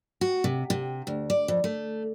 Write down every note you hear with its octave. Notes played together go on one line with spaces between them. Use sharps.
F#4
C3
C3
D2
D5
F2
A3